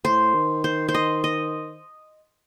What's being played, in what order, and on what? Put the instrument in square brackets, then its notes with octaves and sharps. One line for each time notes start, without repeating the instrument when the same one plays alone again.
[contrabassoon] A2 [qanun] C5
[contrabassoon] D#3
[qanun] C5
C5
D#5
D#5